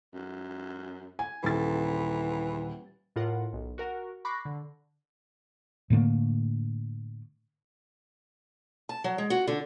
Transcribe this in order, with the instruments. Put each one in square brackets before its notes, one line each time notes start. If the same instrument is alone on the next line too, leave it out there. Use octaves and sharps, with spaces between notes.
[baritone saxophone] F#2
[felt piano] G#5
[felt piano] D#1 A6 [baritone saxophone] E3
[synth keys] A2 F4 A#4 F#5
B1
F#4 A#4 F#5
B5 C#6 D6 F#6 A#6 C7
D3
[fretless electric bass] A2 D3 A3 A#3
[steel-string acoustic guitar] A5
F#3
G#3
F#4
D3